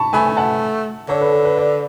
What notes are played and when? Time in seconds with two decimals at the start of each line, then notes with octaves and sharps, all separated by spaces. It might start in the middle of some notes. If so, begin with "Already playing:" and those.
Already playing: A5 B5 C#6
0.13 A3 G#5 B5
0.27 G#5
0.37 F#5 A5
1.09 D3 A4 C#5
1.21 B4
1.33 A4
1.45 B4
1.57 B4 D5